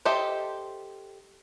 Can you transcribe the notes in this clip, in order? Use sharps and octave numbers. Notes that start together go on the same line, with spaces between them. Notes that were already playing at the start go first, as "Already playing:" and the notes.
G4 A4 C5 D#5 E5